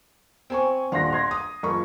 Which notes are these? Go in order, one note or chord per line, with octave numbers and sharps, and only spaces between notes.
C4 G#5 C#6
D#1 D4 F5 F#5 C6 A#6
C6 G#6 A#6
D#6
F#1 F4 C#6